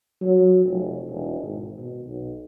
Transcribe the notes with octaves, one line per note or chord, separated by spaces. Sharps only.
F#3
F1
E1
G#1
B2
B1